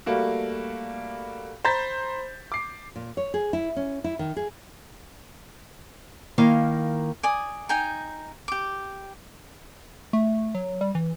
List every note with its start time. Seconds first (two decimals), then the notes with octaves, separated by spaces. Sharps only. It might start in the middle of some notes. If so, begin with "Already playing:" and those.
0.06 G3 A3 A#3 F#4
1.65 C5 A#5 B5 G6 A6 B6
2.52 D6 C7
2.96 A#2
3.17 C#5
3.34 G#4
3.53 E4
3.76 C#4
4.04 E4
4.19 D#3
4.36 G#4
6.38 D#3 A#3 E4 F5
7.23 D5 G#5 D#6
7.69 D#4 G5 G#5 A#5
8.48 G4 D6
10.13 A3
10.55 F#3
10.81 G3
10.95 E3